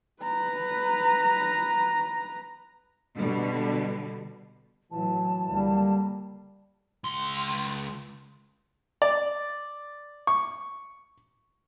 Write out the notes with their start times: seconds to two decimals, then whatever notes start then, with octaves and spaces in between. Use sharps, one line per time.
0.23 B4 A#5
3.17 B2 D3 G3
4.91 A2 E3 F#3 A5
5.46 C#2 D3 G3 A#3
7.04 C#2 C6
9.02 D5
10.27 C#6